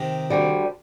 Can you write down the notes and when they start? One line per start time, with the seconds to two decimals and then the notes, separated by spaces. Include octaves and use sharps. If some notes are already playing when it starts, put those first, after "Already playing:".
Already playing: C3 D#3
0.30 D2 D3 G3